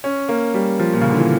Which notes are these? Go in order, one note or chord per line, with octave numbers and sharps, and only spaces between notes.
C#4
A#3
G3
F3
A#2
C#3
D3
E3